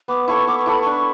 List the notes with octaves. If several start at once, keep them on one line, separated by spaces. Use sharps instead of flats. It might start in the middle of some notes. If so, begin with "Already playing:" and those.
B3 D6
E4 A4 C#5 C#6
B3 D6
C#6
E4 A4 C#5 B5
D4 C#6